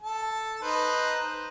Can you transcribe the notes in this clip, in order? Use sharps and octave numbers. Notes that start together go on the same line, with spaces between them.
A4 A5
D#4 B4 C5